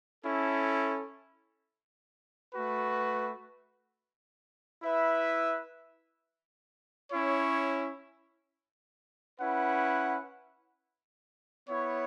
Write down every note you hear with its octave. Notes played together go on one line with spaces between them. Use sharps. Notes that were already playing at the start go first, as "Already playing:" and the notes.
C#4 E4 A4
A3 F#4 B4
E4 B4 E5
C#4 E4 C#5
C#4 E4 B4 F#5
B3 E4 C#5